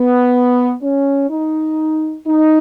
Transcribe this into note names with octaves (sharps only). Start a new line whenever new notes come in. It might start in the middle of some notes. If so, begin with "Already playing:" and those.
Already playing: B3
C#4
D#4
D#4